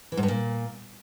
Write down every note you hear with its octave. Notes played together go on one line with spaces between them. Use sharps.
E3
G#2
G2
A#2